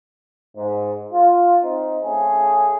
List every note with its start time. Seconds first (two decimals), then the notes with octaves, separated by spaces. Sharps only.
0.56 G#2
1.12 F4
1.62 C4 D#4
2.03 C#3 A3 G#4